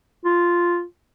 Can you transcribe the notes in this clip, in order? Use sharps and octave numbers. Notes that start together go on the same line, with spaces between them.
F4